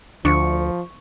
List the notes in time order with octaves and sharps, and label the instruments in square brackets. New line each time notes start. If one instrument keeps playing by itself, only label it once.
[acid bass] D2 [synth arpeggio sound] D3 D4 [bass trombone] F3 [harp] C#6 C#7